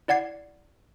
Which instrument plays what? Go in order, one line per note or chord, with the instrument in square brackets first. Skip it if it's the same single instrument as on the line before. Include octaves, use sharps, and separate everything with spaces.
[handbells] E4 D5 F#5 G#6 C7